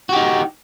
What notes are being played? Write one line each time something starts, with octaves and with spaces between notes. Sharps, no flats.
D#4 F#4 G4